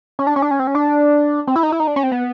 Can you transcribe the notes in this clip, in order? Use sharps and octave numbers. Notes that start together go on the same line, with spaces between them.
C#4
D4
C#4
D4
C#4
C4
C#4
D4
C4
E4
D#4
E4
D#4
D4
C#4
C4
B3